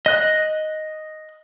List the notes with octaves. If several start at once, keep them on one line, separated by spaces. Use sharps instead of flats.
D#5 F#6